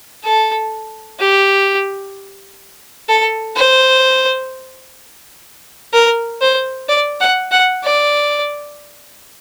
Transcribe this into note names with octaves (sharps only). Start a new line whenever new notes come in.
A4
G4
A4
C5
A#4
C5
D5
F#5
F#5
D5